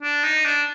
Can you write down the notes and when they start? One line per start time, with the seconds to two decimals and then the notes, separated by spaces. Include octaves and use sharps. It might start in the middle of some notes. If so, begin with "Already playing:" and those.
0.03 D4
0.24 D#4
0.45 D4